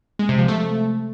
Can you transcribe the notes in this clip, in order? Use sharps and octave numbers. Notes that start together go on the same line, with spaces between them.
G#3
C3
F3
A3